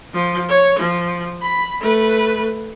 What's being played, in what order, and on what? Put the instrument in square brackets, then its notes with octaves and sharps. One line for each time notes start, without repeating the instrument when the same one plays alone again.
[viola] F3
C#5
F3
B5
A3 B4